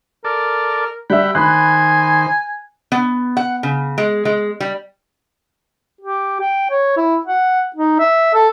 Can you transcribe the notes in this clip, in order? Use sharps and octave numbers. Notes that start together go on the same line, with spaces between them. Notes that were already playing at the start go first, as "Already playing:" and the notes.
A4 A#4 D5
G3 E5 F#5 G5 B5
D#3 C5 G#5 B5 F#6
B3
F#5
C#3
G#3
G#3
G3
G4
G5
C#5
E4
F#5
D#4
E5
A4